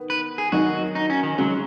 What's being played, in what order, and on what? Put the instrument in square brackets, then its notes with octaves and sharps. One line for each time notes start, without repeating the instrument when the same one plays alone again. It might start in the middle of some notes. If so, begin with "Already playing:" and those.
Already playing: [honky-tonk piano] D#3 B3
[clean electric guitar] B4
G#4
[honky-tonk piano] D#3 F#3 D#4 [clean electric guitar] F#4
[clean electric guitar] D#4
C#4
D#3
[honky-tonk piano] C#3 G#3 C#4 F#4 [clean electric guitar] F#3